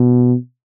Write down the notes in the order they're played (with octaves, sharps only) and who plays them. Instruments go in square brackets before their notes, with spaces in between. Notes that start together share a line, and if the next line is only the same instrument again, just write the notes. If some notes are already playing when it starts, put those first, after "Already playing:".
Already playing: [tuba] B2